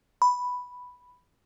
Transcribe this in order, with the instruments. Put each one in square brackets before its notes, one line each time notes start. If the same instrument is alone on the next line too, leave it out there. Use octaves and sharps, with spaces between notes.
[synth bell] B5